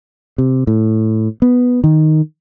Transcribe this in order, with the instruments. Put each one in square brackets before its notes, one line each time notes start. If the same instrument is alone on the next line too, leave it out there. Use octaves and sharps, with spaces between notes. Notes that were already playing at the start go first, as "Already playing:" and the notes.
[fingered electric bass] C3
A2
B3
D#3